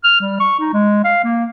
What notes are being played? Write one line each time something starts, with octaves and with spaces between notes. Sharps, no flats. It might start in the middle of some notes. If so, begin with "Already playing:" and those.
F6
G3
C#6
D#4
G#3
F5
A#3